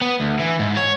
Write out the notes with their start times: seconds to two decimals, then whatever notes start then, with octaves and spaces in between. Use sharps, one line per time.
0.01 B3
0.20 D2
0.39 E3
0.59 G#2
0.76 C#5